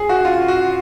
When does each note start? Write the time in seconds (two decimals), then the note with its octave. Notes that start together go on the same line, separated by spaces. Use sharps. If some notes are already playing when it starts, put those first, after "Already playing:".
Already playing: G#4
0.09 F#4
0.25 F4
0.48 F#4